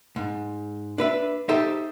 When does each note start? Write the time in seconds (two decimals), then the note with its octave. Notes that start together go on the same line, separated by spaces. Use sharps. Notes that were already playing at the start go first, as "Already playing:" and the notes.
0.16 G#2
0.98 D4 B4 E5
1.49 D#4 G4 A4 C5 E5